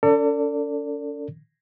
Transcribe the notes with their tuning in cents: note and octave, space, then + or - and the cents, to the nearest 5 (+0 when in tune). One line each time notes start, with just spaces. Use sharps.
C#4 +40 A4 +35 D5 -15